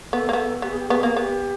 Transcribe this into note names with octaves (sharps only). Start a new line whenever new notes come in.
B3 A4
A#3
B3 A4
B3 G4
G#4
G4
B3 G#4
A#3
B3 G4